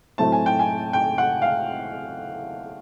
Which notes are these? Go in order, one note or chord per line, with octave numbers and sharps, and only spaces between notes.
A2 F#3 A3 C4 A5
G#5
G5
G#5
G5
F#5
F5